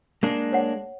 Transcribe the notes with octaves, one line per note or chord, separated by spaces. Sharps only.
G#3 A#3 D4
C#5 F#5